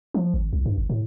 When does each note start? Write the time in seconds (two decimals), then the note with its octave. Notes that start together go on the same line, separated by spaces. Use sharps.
0.14 F3
0.34 G#1
0.53 C2
0.66 G2
0.78 G1
0.90 A2